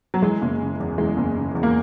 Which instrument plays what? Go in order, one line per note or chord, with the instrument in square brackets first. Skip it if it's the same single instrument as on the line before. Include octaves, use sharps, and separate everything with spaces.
[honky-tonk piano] F#3
E3 G#3
F#1
C#3
E2
E3 G#3
F#1
C#3
E2
A#3